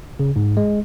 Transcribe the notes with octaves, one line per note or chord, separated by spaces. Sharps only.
C#3
G#2
G#3